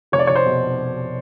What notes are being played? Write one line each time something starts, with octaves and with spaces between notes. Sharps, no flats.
F1 C#5
D5
F1 C#5
C5
B2